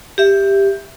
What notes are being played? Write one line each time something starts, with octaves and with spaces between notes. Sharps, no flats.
G4 E5